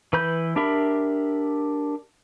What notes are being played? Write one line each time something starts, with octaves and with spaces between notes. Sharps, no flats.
E3 B4 B5 G6
D4 G4 A#4 E5 B5